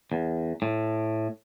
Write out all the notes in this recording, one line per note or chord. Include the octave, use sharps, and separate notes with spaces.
E2
A2